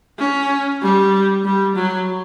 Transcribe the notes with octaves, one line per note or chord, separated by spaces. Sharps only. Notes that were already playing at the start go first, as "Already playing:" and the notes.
C#4
G3
G3
F#3